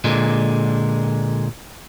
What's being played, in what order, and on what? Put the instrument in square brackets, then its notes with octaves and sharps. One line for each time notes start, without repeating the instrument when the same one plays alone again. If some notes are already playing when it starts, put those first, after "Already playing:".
[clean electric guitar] A#2 D3 G#3